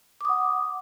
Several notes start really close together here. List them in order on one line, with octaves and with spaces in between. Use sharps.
D6 D#6 F#5